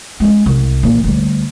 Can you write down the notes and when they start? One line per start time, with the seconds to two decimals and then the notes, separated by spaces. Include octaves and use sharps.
0.20 G#3 C#4
0.46 C2
0.83 A#2 E3
1.04 D2 G3